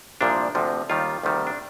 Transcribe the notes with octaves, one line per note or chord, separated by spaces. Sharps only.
C2 A#2 F3 D4
D2 C3 F3
D#2 D#3 G3 F4
D2 C3 D#3 G3
D4